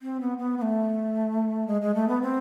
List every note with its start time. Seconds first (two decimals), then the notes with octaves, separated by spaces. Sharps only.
0.02 C4
0.21 B3
0.38 B3
0.58 B3
0.62 A3
1.67 G#3
1.81 G#3
1.95 A3
2.08 B3
2.22 C4